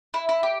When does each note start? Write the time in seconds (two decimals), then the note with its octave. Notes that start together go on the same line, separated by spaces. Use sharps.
0.14 E4
0.29 E4
0.43 G4